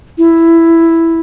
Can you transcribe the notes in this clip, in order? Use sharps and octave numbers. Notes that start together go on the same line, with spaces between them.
E4